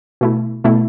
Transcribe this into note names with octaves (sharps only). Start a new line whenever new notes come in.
B2 A3 E4
B2 A3 E4